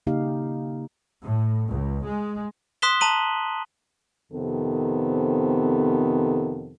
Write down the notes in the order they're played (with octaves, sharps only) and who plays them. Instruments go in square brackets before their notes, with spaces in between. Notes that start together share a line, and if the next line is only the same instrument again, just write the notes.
[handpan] C#3 A#3 D#4 G4 F5
[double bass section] A2
C#2
G#3
[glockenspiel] C6 D#6 F#6 B6 E7 G7
A5 A#5 D#7 F#7
[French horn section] F2 C3 D#3 B3 A4